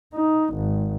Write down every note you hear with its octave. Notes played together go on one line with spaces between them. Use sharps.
D#4
G#1